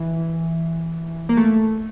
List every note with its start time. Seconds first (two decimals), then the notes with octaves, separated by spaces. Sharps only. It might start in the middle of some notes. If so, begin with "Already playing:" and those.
Already playing: E3
1.29 A#3
1.37 A3